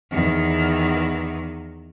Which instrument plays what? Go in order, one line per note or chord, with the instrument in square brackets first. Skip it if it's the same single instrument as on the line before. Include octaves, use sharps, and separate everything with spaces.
[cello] E2 D#3